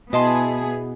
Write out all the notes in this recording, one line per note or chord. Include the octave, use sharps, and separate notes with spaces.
B2 B3 E4 G#4 D#5 A5 C6